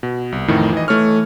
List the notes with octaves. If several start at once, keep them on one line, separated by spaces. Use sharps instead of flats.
B2
C2
F2 A2 D#3 E3
E3 D#5
E3 A3 C#5 C#6 F6